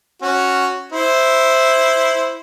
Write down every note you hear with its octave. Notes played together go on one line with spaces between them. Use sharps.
C#4 F#4
E4 C5